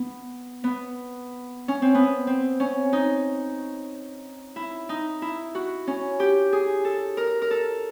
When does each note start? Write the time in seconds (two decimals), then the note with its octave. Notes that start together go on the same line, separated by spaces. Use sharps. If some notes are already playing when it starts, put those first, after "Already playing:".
Already playing: B3
0.64 B3
1.68 C#4
1.82 C4
1.95 B3
2.27 C4
2.60 C#4
2.93 D#4
4.56 E4
4.89 D#4
5.22 E4
5.55 F#4
5.87 C#4
6.20 G4
6.53 G#4
6.85 A4
7.17 A#4
7.42 A#4
7.51 A4